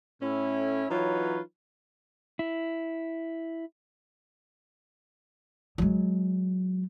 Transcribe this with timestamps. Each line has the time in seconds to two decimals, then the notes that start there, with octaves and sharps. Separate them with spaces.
0.21 A2 C#4 E4
0.90 E3 F#3 D#4 F4 B4 C#5
2.39 E4
5.78 F#3 G#3